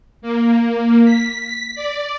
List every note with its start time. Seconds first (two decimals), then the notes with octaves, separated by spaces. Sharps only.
0.22 A#3
1.05 B6
1.75 D5